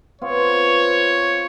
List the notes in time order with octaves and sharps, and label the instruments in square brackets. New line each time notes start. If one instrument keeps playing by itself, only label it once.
[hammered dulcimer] B3 C4 F4 [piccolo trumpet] C#5